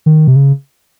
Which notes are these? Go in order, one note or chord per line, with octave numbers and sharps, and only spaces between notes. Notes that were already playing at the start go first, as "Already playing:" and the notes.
D#3
C3
C#3